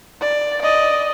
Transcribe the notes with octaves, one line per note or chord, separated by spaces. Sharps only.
D5
D5 D#5